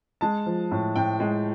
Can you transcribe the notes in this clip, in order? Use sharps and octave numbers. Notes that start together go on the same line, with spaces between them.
G#3 A5
F3
A2
A2 G5
G#3